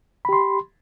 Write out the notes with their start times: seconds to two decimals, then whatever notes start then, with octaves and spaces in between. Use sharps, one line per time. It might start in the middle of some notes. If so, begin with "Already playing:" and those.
0.25 B5
0.29 G4
0.33 C6